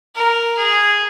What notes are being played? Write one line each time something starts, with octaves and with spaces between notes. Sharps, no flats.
A#4
G#4